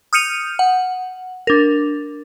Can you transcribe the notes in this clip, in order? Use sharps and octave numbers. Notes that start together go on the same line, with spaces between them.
D#6 F6 G6 C#7 D#7 F7
F#5
D4 A#4